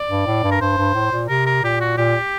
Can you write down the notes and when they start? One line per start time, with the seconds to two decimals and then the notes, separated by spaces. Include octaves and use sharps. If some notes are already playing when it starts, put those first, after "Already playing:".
Already playing: D5
0.09 G2
0.26 A2
0.44 G2
0.51 A#4
0.61 G2 C5
0.78 G2
0.95 A2
1.12 A#2
1.29 C3 A#4
1.46 A#4
1.63 A#2 G4
1.80 F#4
1.97 A#2 G4